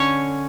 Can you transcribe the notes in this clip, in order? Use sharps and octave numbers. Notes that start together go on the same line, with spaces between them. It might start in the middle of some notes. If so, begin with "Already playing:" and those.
Already playing: D3 C#4 C#5